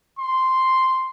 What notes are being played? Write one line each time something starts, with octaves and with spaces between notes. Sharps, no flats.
C6